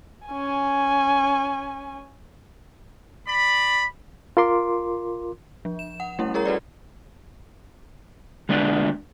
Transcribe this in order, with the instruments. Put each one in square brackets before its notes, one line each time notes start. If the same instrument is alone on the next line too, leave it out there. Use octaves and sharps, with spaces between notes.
[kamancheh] C#4 G#5
[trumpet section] D5 B5
[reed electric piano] F4 A#4 C6 D6
[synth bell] F3
E7
F#5
G3 A3 C#4 E4
G#4 A#4 C#5 A#5
F#4 A4 B4 D5
[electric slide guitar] D3 G#3 B3 D4 D5